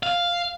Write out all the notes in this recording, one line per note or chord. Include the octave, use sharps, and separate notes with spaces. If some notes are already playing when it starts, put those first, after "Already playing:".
F5